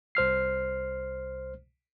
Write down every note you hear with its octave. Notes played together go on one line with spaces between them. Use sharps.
C2 C5 F6 C7